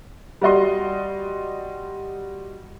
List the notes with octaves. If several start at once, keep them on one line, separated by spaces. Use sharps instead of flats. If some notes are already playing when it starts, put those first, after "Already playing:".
G3 F#4 D#5 C6